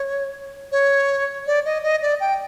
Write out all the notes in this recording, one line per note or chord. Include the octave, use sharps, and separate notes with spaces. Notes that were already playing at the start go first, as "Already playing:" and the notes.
Already playing: C#5
C#5
D5
D#5
D#5
D5
G5